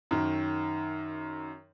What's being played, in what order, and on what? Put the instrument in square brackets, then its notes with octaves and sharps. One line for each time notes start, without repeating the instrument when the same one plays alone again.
[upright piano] F#2 D#3